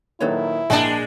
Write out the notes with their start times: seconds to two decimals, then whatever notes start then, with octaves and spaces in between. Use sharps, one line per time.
0.20 A#2 D#3 F#3 E4 A4 B4 C#5
0.70 A#1 G#3 D4 G5 A5